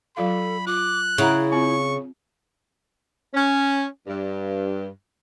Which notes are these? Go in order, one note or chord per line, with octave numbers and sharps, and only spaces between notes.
F#3 F4 A4 F5 B5
F4 D6 F#6
C#3 E4 E5 F#5 A#5
C4 F4 C#6
C#4
G2